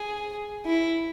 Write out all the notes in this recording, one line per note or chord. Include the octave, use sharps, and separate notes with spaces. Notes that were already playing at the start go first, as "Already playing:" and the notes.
Already playing: G#4
E4